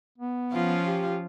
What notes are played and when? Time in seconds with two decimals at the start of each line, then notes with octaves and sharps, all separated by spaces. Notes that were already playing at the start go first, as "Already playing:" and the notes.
0.18 B3
0.53 F3 C#4 F4
0.87 G4